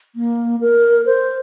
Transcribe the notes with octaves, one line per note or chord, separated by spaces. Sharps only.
A#3
A#4
C5